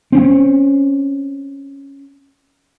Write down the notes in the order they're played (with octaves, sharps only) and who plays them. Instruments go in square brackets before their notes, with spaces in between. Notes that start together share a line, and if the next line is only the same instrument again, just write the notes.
[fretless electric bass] C4 C#4